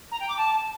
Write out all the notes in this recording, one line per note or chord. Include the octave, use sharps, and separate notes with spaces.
A#5
G5
D6
A5